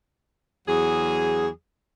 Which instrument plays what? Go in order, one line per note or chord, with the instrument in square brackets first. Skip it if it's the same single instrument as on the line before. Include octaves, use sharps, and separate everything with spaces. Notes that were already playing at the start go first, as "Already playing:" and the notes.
[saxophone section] E2 F#3 G#4